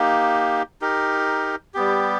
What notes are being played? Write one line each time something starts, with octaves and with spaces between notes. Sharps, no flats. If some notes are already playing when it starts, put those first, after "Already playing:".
Already playing: A#3 D#4 G4
D#4 G4 A#4
G3 B3 G4